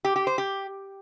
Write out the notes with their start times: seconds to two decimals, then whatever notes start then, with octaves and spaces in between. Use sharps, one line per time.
0.05 G4
0.16 G4
0.27 C5
0.38 G4